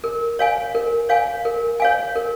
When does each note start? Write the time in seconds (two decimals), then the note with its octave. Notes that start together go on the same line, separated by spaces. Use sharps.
0.04 A#4
0.39 C#5 F5 G#5
0.75 A#4
1.09 C#5 F5 G#5
1.45 A#4
1.80 C#5 F5 G#5
2.16 A#4